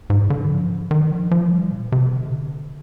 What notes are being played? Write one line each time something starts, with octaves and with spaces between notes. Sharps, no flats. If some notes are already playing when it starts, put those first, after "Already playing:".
G#2
D3
D#3
F3
D#3
F3
F3
G3
A#2
C3
D3